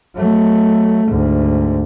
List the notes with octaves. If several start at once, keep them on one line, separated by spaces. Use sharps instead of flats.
F#3 A3
D2 G#2